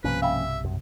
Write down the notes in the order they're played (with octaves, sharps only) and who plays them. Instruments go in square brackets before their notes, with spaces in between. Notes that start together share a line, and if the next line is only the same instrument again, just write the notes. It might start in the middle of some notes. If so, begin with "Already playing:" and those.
[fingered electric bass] B1 G2 C3 [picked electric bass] F3 A#3 C#4 [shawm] B4
[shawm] E5 [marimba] F5 G5 B5
[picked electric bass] F#2